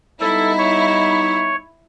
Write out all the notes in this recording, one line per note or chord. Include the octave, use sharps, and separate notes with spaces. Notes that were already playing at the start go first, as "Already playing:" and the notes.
G3 B3 D#4 E4 A4
C#5